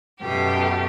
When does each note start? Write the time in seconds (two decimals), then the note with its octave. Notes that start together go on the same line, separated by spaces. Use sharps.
0.20 F#2 B2 A3 G4